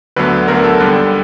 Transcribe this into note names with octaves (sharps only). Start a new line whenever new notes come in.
D2 D3 F#3 B3 B4
D2 D3 F#3 B3 A#4
A4
D#2 D3 G3 B3